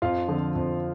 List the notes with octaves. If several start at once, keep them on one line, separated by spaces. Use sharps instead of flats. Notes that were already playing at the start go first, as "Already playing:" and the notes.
F2 F4 F5
D3 F3 C4
F2